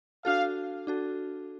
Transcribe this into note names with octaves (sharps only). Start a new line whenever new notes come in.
D4 F#4 A4 F5
D4 F#4 A4